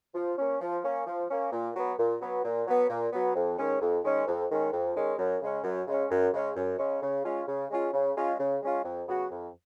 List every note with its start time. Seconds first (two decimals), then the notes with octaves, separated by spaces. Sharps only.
0.15 F3
0.38 A#3 C#4
0.61 F3
0.84 A#3 C#4
1.07 F3
1.30 A#3 C#4
1.52 A#2
1.75 F#3 B3
1.98 A#2
2.21 F#3 B3
2.44 A#2
2.67 F#3 B3
2.90 A#2
3.13 F#3 B3
3.35 F2
3.59 D#3 G#3 C#4
3.81 F2
4.04 D#3 G#3 C#4
4.28 F2
4.50 D#3 G#3 C#4
4.73 F2
4.96 D#3 G#3 C#4
5.18 F#2
5.41 C#3 G#3 C#4
5.64 F#2
5.87 C#3 G#3 C#4
6.10 F#2
6.33 C#3 G#3 C#4
6.56 F#2
6.79 C#3 G#3 C#4
7.02 C#3
7.24 G#3 C#4 F4
7.47 C#3
7.70 G#3 C#4 F4
7.93 C#3
8.16 G#3 C#4 F4
8.39 C#3
8.62 G#3 C#4 F4
8.84 F2
9.08 C#3 F#3 B3 F#4
9.31 F2